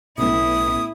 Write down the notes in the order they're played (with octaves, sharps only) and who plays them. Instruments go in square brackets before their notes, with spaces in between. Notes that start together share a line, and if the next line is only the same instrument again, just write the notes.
[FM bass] B1 [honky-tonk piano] A2 B3 C#4 [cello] E4 [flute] D#6